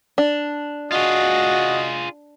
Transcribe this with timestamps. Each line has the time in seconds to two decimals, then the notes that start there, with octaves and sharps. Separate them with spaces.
0.18 D4
0.92 F4 F#4 G#4 D#5